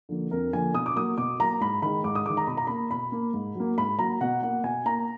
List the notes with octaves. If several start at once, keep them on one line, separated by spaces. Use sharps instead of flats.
D3 F3 A#3
F2 A#4
D3 F3 A#3 G#5
B2 D#6
D6
F#3 A#3 D#6
B2 D6
F#3 A#3 A#5
G#2 B5
D#3 G#3 B5
G#2 D6
D#6
D#3 G#3 D6
A#5
B2 B5
A#5
A#3 B5
B2 B5
A#3
G#2
F#3 A#3
G#2 B5
F#3 A#3 A#5
B2 F#5
A#3 F#5
B2 G#5
A#3 A#5